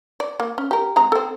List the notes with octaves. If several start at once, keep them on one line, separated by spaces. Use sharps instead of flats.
D5
A#3
C#4
G4 A#4
G#3 C4 A#5
C4 A4